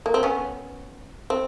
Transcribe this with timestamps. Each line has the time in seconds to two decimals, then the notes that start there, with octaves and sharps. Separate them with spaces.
0.06 A#3
0.14 C4
0.23 B3 C#4
1.30 C4